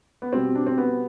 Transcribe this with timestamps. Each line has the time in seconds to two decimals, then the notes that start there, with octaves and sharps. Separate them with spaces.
0.22 B3
0.33 B2 G3 C4
0.55 D4
0.67 C4
0.78 B3